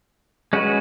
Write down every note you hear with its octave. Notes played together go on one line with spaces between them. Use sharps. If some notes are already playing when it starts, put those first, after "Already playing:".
G#3 C#4 F#4 B4